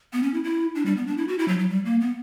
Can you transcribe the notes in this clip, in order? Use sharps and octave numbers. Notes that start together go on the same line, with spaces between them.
B3
C#4
E4
E4
D4
G3
B3
D4
E4
F#4
E4
F#3
F#3
G3
A#3
B3